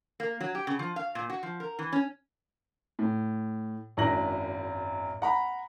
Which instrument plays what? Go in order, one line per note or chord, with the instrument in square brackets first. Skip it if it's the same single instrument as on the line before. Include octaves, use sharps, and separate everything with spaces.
[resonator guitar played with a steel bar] A#3
F#3
G4
C#3
F3
F5
A#2
F#4
F3
A#4
E3
C#4
[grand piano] A2
G#1 F#2 D4 E4 A#6 F#7
F#5 A#5 B5